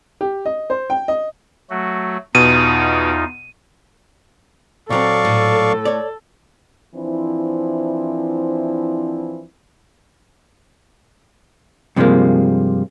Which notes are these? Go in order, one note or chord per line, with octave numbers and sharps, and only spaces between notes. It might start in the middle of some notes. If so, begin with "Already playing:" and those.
G4
D#5
C5
G5
D#5
F#3 A3 F#4
E2 B2 D#4 F4 D#7
A#2 F#3 C4 A4 D5 F5 C#6
A2
C#5 D5
E3 F3 C4 D4 E4
G2 C3 F3 F#3 G#3 A#3